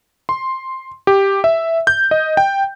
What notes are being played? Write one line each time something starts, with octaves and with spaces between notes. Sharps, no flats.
C6
G4
E5
G6
D#5
G5